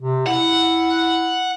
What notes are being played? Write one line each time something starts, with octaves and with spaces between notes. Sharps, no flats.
C3
E4 F#5